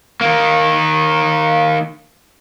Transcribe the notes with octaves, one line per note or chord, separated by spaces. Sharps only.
D#3 A#3